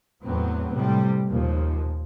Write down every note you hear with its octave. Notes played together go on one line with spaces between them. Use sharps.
E2 A2 F#3 B3 C4
A2 C3 G3
D#2 A#2 F3